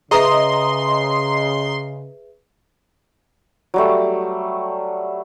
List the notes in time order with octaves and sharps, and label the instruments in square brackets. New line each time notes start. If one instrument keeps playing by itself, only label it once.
[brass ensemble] C#3 [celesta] G#4 B4 E5 [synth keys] D#5 A#5 D#6 [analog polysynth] C6
[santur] F#3 G3 A3